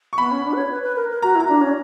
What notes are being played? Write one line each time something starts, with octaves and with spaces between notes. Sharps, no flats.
C#6
B3 B5
C#4
D4
B4
C#5
B4
B4
A#4
A#4
F#4 A#5
E4
A#5
D4
C#4